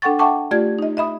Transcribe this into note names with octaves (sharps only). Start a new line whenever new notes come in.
D4 A4 F#5 G5 C#6 A6
E5 F#5 G5 A5 C#6 D6
A3 F4 G4 D5 G#6
D#4 D#5
D#5 E5 B5 D#6